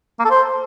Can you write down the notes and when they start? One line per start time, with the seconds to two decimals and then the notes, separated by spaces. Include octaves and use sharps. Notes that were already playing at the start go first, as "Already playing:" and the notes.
0.20 A#3
0.25 A4
0.31 C5